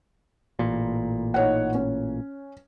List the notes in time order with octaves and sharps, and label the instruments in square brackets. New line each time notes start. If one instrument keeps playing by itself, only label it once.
[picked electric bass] A1 A#2
[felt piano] D#4 C#5 F#5
C#4